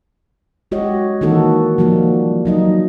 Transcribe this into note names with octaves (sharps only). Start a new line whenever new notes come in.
G#3 F#4 G4 C#5 D#5
D#3 E3 A#3 D#4 F#4 A4
F3 G3 A#3 F#4
F#3 D#4 D#5